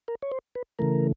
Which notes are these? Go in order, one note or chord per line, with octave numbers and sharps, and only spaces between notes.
A#4
C#5
C5
B4
C#3 E3 A3 A#4